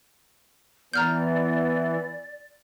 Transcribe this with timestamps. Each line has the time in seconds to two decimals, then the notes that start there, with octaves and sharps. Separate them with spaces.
0.94 E3 B3 D5 A#5 F6 G6